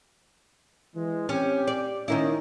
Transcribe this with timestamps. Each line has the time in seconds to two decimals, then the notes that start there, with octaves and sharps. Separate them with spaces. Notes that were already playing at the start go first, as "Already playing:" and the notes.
0.95 E3 G#3
1.29 C4 C#4 G4
1.67 D5
2.08 D#3 A#3 C#4 E4 D#5